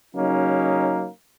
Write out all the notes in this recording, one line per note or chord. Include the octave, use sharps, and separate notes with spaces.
C#3 F#3 A#3 C#4 D#4